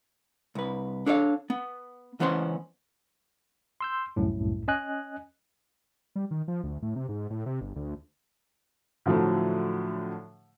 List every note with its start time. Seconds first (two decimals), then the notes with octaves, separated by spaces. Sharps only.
0.55 C2 B4
1.06 D4 A4 C#5 D5 F5
1.50 B3
2.20 C#2 E3 B3 C#4 C5 C6
3.81 C6 E6 G6
4.16 C2 F#2 A2
4.68 C#4 D#5 G#5 F#6
6.16 G3
6.31 D#3
6.48 F3
6.64 D2
6.82 A2
6.96 C3
7.09 G#2
7.30 A2
7.46 C3
7.61 G1
7.76 D2
9.06 A2 D3 F3 F#3 A3